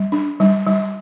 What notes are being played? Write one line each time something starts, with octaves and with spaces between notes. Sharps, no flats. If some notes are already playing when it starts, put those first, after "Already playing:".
Already playing: G3
D4
G3
G3